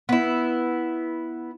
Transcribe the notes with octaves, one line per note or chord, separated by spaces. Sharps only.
B3 E4